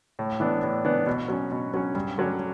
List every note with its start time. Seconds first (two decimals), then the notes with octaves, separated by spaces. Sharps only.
0.19 A2
0.40 E3 B3 D4
0.63 A2
0.85 E3 B3 D4
1.06 B2
1.28 F#3 C#4
1.52 B2
1.74 F#3 C#4
1.95 G2
2.18 D3 F#3 C#4